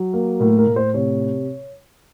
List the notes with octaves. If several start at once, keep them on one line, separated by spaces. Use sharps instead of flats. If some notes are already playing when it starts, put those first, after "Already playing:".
Already playing: F#3
A#3
A2 A#4
A#4
A2
C5
C3 C#5